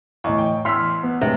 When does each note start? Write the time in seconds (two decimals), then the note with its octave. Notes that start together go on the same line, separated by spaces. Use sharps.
0.24 E2 A2 D#5 C#6
0.38 G5
0.65 E2 C6 E6 F6 B6
1.03 B3
1.21 A2 C3 G#3 B4